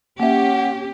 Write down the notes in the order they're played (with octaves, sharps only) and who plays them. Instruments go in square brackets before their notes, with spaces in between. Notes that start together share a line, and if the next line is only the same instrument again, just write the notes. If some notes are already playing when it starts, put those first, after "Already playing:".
[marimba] A#3 E5 [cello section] C#4 G4 [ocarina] F#5